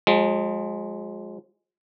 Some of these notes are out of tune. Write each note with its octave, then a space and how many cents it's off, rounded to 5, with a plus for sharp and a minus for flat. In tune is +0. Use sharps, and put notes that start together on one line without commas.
F3 +45 G#3 +0